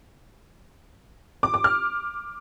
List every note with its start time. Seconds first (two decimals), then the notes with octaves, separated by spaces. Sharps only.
1.43 D6
1.54 D6
1.64 F6